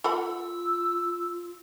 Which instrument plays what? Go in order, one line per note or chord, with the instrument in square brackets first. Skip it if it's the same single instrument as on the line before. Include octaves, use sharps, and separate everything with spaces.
[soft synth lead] F4 [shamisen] A4 F#5 B5 [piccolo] E6